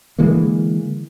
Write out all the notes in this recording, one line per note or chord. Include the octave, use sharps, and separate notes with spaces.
D3 E3 G#3 A#3